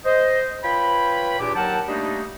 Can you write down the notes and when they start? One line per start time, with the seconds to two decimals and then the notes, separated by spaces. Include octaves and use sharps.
0.05 C5 D#5
0.64 F4 B4 C#5 G5 B5
1.40 E2 A#2 D4 G4 D6
1.55 D#2 F#3 A#4 F#5 G5 A5
1.88 G3 A3 A#3 D4 D#4